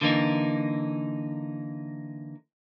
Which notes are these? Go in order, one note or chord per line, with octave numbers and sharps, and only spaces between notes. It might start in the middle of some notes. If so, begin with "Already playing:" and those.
D3 E3 A#3 D#4